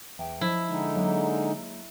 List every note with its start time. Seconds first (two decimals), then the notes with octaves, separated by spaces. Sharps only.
0.19 E2 E5 G5
0.41 F3 E4 D#5
0.69 D3 G#3 D#4
0.95 F#3 A#3 G#4